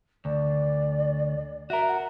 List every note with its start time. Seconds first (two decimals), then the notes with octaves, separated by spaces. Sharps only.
0.25 D2 D5
1.70 F#4 A#4 E5
1.88 F#5